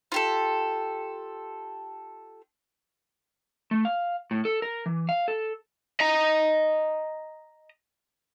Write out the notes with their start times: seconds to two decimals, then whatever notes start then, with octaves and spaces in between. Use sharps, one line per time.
0.12 F4 G4 A4
3.71 A3
3.85 F5
4.31 A2
4.45 A4
4.62 A#4
4.86 E3
5.09 F5
5.28 A4
6.00 D#5 A#5